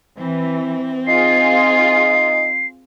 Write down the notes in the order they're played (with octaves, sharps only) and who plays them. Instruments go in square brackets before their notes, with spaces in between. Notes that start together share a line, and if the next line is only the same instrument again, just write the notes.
[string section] E3 [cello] C4
[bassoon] D#4 [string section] F4 G#4 [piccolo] C7